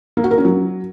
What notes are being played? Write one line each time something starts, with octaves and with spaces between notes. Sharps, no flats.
A#3
F#4
A#4
C#4
F#3